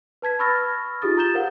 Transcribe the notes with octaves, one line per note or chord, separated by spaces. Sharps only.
B4 A5 G#6 B6
B5 C#6 E6 F6 A6 A#6
D#4 F4 G4 G#4 D#6 A6
A#5 D#6 G6 A6 E7 G7
A#4 C5 F5 F#5